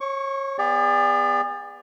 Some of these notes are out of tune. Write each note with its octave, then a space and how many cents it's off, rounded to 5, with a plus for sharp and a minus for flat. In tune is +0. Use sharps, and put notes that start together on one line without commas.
C#5 -30 C#6 +15
B3 +0 G#4 -40 D5 +0